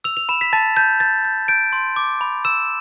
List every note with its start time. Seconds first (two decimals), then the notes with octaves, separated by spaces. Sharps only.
0.04 E6 F7
0.17 F7
0.29 B5 E7
0.41 B6
0.53 A5 A6
0.77 A5 G6
1.00 G6 A6
1.25 G6
1.48 G6 D7
1.73 C6
1.96 D6
2.21 B5
2.45 E6 E7